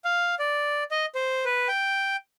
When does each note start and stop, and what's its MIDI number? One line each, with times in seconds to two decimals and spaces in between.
0.05 0.35 77
0.39 0.84 74
0.91 1.06 75
1.15 1.45 72
1.45 1.68 71
1.68 2.16 79